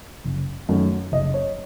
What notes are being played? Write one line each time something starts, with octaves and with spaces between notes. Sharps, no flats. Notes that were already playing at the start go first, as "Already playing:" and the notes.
F#1
F#2 D#3 A3
F#1 D#5
C#5